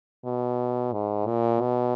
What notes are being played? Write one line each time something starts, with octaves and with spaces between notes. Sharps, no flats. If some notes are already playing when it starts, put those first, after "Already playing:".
B2
G#2
A#2
B2